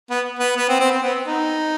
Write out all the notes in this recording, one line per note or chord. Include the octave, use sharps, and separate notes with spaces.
B3
B3
B3
C4
C4
C4
B3
D#4